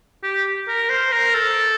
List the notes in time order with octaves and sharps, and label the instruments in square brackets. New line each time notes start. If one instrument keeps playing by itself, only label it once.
[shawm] G4
A#4
C5
A#4
A4